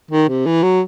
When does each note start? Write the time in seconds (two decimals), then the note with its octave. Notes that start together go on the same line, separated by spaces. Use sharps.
0.11 D#3
0.29 C3
0.46 E3
0.63 F#3